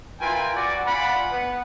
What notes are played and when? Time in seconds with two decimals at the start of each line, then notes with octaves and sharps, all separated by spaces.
0.20 E4 F4 A#4 B4 G5 G#5
0.55 F#4 D5
0.85 F4 D5 F#5 G#5 B5
1.31 B3 F#5